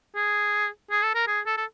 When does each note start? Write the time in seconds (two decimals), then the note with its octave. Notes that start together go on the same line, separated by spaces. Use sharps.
0.16 G#4
0.91 G#4
1.03 A4
1.15 A#4
1.28 G#4
1.46 A4
1.58 A4